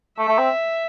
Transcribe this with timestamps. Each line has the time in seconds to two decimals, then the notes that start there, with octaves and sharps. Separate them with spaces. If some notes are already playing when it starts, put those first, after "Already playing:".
0.18 A3 E5
0.28 A3
0.38 C4